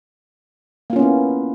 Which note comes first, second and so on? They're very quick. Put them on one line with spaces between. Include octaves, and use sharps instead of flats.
A#3 F4 C#4 B3 E4